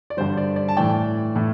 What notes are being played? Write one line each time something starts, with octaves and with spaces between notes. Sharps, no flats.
D5
G2 D3 G3 C5
D5
D5
A5
A2 E3 A3 D5 G5
A2 A3